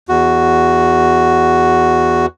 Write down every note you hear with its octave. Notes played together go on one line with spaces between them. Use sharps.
E2 F#4